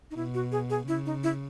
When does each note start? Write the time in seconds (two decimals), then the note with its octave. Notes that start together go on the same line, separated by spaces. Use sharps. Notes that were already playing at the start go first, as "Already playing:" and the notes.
0.11 D#4
0.16 B2 E4
0.34 F#4
0.52 G#4
0.70 G#4
0.87 C#3 E4
1.06 D#4
1.23 E4